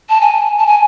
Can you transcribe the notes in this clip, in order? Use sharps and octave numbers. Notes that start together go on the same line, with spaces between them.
A5
G#5
A5
G#5